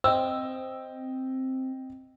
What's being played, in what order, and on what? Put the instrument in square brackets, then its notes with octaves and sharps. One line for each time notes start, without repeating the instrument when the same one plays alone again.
[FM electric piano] C4 [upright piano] D#5 G5 E6